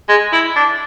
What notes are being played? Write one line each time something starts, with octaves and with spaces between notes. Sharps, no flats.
G#3
E4
D4